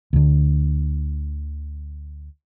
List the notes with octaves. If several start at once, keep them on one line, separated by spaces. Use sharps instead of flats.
D2 D3